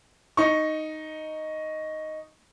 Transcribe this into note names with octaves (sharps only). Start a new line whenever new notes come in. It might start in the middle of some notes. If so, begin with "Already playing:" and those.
D#4 C#6